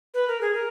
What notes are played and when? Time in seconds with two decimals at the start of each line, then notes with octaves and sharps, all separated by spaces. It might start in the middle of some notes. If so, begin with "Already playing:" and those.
0.14 B4
0.28 A#4
0.41 G#4
0.54 A#4